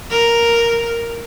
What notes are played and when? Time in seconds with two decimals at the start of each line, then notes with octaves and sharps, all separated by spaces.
0.11 A#4